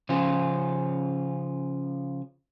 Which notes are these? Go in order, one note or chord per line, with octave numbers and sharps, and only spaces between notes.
C#3 F3 C#4 F4